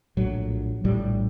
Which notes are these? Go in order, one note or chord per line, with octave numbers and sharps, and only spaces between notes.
A#1 A2 F#3
A#1 A2 G3